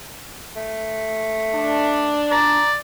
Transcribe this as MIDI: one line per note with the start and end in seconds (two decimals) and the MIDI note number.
0.56 2.23 57
1.55 2.61 62
2.31 2.76 74
2.31 2.68 82